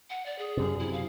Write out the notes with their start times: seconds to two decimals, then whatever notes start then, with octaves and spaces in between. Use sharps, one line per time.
0.10 F#5
0.26 D5
0.39 G#4
0.57 F#2 C3
0.80 E4
0.93 F5